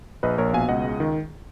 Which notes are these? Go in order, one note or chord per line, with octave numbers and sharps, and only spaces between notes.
A#1 B4 D#5
A#1 A#4 C#5
B2 F5 G#5
C#2 D#5 F#5
G#3
D#3